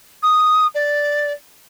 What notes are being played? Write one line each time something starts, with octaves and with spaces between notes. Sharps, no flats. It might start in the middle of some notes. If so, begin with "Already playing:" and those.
D#6
D5